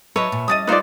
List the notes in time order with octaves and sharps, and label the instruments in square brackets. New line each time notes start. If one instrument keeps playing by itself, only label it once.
[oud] F#3 D#4 [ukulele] B4 [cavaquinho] C#5 E5 A5
[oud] A#2
[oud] G3 F#4 D#5 [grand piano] D#6 A6 D#7
[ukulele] D#4 F4 D5 [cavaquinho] B4 C5